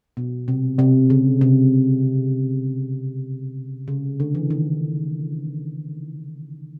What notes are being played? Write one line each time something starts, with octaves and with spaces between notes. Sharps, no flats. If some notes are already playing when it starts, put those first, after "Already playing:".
B2
C3
C3
C#3
C3
C#3
D3
E3
D#3